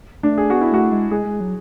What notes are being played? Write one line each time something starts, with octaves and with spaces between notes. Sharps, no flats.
A3 D4
G#4
B3 F#4
E4
A3 F#4
G#3
G#3 G#4
G#3
F#3